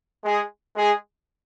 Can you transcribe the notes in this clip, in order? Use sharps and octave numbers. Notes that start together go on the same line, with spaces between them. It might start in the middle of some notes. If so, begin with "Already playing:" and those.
G#3 G#4
G#3 G#4